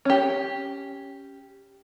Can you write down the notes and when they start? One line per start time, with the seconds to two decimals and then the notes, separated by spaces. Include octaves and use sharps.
0.05 C#4 G4